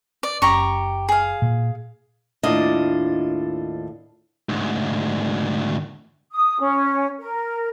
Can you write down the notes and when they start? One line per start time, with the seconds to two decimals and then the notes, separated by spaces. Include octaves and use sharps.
0.23 D5
0.42 F#1 C#4 G4 A#5 C#6
1.09 G#4 F5
1.42 A#2
2.43 D#2 A2 D4 F4 D#5
4.49 D2 G#2
6.31 D#6
6.59 C#4
7.19 A#4